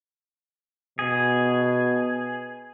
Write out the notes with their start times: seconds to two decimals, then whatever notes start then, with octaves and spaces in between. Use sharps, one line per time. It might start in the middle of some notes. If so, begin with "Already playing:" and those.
0.99 B2 G#4